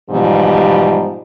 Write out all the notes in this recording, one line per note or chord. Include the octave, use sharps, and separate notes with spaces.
G#2 B2 E3 F3 G3